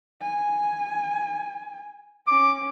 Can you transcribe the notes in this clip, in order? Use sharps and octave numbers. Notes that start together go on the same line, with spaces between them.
G#5
C#4 D6